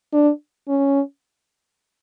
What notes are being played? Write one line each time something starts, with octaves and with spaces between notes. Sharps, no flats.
D4
C#4